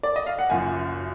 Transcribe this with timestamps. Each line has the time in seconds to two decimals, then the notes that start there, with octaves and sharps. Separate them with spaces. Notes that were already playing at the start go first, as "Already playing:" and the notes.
0.03 D5
0.16 D#5
0.26 F5
0.39 F#5
0.50 F#1 F#2 F3 G#5